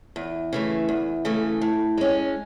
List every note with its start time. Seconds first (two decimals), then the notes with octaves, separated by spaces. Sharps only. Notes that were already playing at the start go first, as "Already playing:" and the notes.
0.16 E2
0.53 C#3 E3 A3
0.89 E2
1.25 C#3 E3 A3
1.61 A2
1.98 G#3 C#4